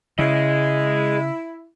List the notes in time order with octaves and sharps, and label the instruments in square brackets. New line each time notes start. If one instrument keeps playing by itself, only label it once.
[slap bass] C#3 [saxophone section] E4 [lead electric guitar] G#4 D#5